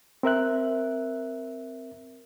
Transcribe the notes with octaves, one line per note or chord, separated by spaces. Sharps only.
C4 A#4 E5 F#6